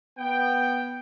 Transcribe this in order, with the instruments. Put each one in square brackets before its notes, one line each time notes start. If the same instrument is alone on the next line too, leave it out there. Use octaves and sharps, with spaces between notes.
[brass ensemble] B3 G5